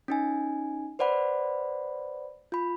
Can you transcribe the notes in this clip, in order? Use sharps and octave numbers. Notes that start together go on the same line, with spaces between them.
C#4 D#4 G#5
B4 C5 D5 F#5 B5
F4 B5